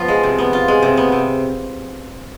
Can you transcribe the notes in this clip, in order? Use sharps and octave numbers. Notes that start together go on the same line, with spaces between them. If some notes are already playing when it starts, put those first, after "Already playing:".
Already playing: F3 B3 F4
G#3
C3
B3
F4
G#3
C3
B3
C3